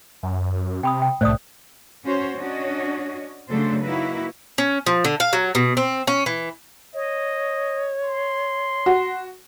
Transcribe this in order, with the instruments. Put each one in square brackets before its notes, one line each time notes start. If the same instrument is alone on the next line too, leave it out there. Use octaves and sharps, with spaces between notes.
[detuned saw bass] F#2
[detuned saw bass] C3 [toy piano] G5 B5 D#6
[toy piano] G5
[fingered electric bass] C2 A2 [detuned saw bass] A3 [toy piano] C5 D5 D#6
[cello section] C#4 F#4 C5 C#5
C#4 D4 F#4 C#5 D#5
C#3 F#3 A3 D4 A4 C5
A#3 D#4 E4 F#4 B4
[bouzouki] C#4
F3
D3
F5
F#3
B2
C4
C#4
E3
[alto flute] C#5 [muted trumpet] D#5
[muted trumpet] C6
[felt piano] F#4